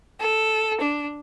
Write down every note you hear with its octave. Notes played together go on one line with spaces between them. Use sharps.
A4
D4